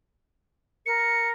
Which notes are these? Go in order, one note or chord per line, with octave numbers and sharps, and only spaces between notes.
A#4 C#7